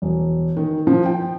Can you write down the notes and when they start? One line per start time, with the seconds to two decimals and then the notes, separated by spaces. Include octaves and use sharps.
0.02 E1
0.57 D#3
0.87 F3
1.06 G5